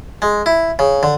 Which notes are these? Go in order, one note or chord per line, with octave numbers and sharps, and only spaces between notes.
G#3
E4
C#3
D3